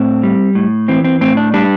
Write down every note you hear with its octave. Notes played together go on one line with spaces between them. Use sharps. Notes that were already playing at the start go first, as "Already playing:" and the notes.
Already playing: A2 C4
G3
A2
E3 C4
C4
A2 C4
D4
G3 D4